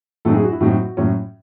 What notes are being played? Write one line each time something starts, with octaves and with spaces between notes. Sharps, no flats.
A2 F#3 C4 D#4 A4
G#4
F#4
E4
A2 F#3 C4 D#4 F#4
A2 F#3 C#4